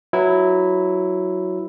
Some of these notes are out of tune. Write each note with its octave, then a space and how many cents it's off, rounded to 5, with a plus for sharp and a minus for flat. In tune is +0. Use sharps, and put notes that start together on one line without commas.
F#3 +0 E4 +0 B4 +0